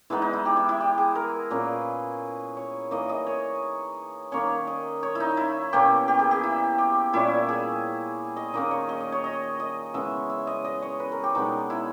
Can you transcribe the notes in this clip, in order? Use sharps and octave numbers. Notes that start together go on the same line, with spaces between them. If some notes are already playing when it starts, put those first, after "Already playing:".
E3 G#3 B3 D#4 E4
D#4
E4
G4
E4
E4
G4
G#4
A#4
A#2 A#3 C#4 B4
C#5
E3 A#3 D#4 D#5
D#5
C#5
D#3 A#3 C#4 C#5
D#5
C#5
E4
D#4
E4
B2 A#3 C#4 G4
G4
G#4
G4
E4
G4
A#2 G3 C#4 E4
G#4
D#5
D#3 A#3 C#4 D#5
C#5
D#5
D#5
C#5
D#5
D#5
C#3 E3 G#3 B3 E5
E5
D#5
D#5
C#5
B4
A#4
G4
B2 G#3 B3 D#4
E4